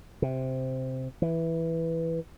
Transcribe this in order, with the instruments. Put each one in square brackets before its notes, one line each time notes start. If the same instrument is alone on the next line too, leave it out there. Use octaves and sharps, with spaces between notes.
[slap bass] C3
E3